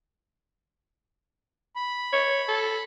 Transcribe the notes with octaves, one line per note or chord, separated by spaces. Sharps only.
B5
C#5
A4